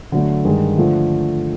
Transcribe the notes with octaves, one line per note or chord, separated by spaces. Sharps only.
D3 F#3 A3
G2 D#3 G#3
D3 F3 A3